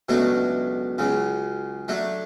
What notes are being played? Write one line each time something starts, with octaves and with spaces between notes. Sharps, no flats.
C#2 B2 F#3 A3 D4
C#2 C#3 F#3
F#3 A3 D4